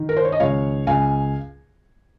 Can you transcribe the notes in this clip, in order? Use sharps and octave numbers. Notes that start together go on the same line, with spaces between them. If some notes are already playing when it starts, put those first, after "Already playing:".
Already playing: D#3
A#4
C5
C#5
D#5
C#2 C#5 F5
C#2 F5 G#5